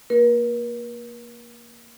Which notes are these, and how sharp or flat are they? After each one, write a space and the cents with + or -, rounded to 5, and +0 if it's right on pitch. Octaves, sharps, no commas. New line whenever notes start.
A#3 +0 A#4 +45